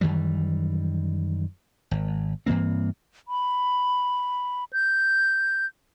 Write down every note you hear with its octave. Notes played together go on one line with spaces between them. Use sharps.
F#2 D#3 E3 G3
G#1
G2 E3 A#3 C4
B5
G6